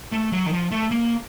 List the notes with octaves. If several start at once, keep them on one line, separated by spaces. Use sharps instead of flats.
A3
F#3
D#3
F3
A3
A#3